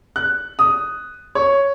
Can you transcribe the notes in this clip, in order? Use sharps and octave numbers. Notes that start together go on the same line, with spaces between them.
F#6
D#6
C#5